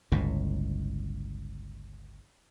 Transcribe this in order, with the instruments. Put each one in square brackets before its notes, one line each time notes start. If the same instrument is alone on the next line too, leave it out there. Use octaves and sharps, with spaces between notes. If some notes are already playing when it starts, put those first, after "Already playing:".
[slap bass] G1 C#2 A2